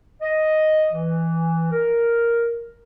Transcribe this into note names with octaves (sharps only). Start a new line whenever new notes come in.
D#5
E3
A#4